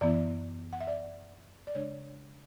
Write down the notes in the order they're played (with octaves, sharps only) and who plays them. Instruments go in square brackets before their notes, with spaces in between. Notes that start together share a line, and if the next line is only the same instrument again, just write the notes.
[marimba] F#2 E3 B3 E4 D5
F#5
E5
D5
D5
C#3 G#3 D4 C#5